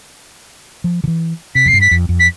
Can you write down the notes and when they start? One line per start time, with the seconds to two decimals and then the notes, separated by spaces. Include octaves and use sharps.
0.84 F3
1.04 D3
1.07 E3
1.55 C3 B6
1.65 F2 C7
1.73 G2
1.81 B6
1.91 F2
2.09 F2
2.20 B6